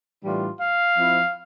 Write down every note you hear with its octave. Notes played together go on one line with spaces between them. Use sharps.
A2 E3 G3 D4 F4
F5
F3 C4 E4